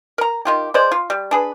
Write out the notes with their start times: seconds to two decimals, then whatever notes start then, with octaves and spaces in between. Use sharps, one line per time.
0.18 A#4 A#5
0.45 D#3 F4 G4
0.74 G#3 C5 D5
0.92 F4
1.10 G3
1.31 D4 G#4 B4